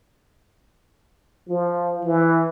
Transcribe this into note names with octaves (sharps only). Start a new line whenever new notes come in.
F3
E3